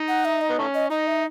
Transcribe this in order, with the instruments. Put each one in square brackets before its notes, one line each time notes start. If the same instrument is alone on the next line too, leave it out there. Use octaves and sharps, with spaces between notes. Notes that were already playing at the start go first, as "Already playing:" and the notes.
Already playing: [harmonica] D#4
[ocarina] F#5
E5
D#5
[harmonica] B3
A3 C#4
[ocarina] D#5
[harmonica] D#4 [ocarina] D#5
[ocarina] E5